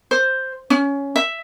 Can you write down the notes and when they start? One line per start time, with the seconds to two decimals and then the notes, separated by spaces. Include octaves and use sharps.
0.11 C5
0.70 C#4
1.16 E5